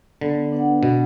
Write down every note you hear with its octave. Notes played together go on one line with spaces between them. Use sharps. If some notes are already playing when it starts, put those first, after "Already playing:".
D3 B3
D4 B4 F#5
B2 B3